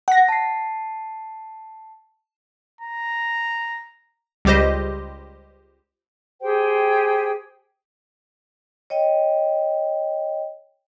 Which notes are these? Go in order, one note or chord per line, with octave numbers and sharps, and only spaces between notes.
F#5 A#6
A5 C7
A#5
C#2 G3 G4 C5 D#5
G4 G#4 C5 G5
C#5 D#5 G5